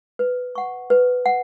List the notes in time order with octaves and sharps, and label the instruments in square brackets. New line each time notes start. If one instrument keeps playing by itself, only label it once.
[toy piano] B4
F#5 C#6
B4
F#5